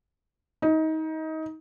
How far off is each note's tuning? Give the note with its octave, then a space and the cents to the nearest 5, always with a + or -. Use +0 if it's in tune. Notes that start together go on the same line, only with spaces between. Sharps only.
D#4 +25